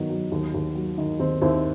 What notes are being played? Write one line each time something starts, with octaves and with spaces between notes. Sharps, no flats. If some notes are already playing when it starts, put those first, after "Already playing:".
Already playing: D#3 F#3 B3
F#3
D#2
D#2
F#3
D#3
D#2 C4
D#2 C4 E4